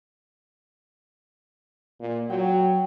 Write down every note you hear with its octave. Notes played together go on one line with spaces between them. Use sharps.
A#2
F#3 G5